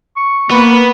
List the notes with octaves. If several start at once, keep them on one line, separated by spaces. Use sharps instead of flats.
C#6
A#3 B3 B4